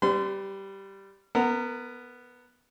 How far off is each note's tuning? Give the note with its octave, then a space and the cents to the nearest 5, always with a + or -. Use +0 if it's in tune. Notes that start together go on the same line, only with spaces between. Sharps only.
G3 -5 B4 +35 C6 -35
B3 +0 A#4 -25